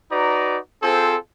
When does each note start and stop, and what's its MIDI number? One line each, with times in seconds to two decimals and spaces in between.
0.12 0.59 63
0.12 0.59 66
0.12 0.59 71
0.12 0.59 74
0.12 0.59 82
0.83 1.18 60
0.83 1.18 65
0.83 1.18 68
0.83 1.18 69
0.83 1.18 72